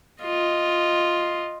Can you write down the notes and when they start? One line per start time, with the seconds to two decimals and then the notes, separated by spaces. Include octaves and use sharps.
0.22 F4 D#5